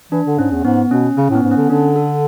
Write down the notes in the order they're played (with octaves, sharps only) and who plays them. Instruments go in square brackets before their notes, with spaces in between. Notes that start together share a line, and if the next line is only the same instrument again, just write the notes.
[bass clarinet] E3 [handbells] D4
[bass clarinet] D3
[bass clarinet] G#2 [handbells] C#4
[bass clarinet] E2
[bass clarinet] G#2 [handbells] B3
[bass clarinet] B2 [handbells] C#4
[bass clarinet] C#3 [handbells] C#4
[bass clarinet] A2
[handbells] B3
[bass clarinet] G#2
[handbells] C#4
[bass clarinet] D3
[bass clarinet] D3 [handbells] D4
[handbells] A4